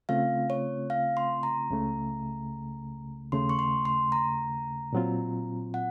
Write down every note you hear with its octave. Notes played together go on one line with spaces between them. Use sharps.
C#3 A3 C4 F4 F5
C#5
F5
C6
A#5
C#2 C#3 A3
D#2 C#3 A3 C6
C#6
C6
C6
A#5
A#2 F#3 C4 F4
F#5